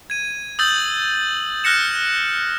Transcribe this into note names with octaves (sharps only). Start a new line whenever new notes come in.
G#6 D#7
D#6 E6 G6 A6 F#7
F6 F#6 A#6 C#7 E7